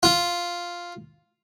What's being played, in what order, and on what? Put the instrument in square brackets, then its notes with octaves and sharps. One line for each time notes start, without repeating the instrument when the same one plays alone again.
[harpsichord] F4